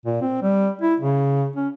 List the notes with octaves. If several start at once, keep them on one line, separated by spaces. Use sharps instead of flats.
A#2
C4
G3
E4
C#3
C#4